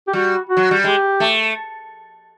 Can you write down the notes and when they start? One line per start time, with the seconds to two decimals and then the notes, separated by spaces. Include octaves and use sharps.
0.07 G4
0.13 G3 F#4
0.49 F#4
0.57 F#3
0.71 G3
0.84 G#3 G4
1.20 A3